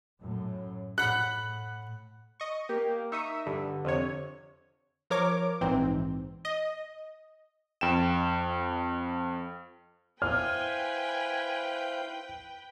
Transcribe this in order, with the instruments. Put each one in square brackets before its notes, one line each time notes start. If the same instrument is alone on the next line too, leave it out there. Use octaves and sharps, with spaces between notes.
[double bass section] F#2 A2
[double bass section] A2 [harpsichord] F#5 B5 [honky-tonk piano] F#6
[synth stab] D#5 C#6
[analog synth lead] A#3 [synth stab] G4
[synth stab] D#4 C#6 D#6 [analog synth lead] E5
[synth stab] G2 [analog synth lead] D3
[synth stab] F2 C3 C#5
F3 A#4 C#5 D6
A#1 G#2 E3 C4
D#5
[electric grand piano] F2 G5 E7
[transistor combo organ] E4 C5 F5 [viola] B4 G5 [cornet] G#5 [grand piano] F6